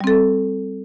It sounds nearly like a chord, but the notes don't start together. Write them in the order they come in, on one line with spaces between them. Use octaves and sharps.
G3 C4 A4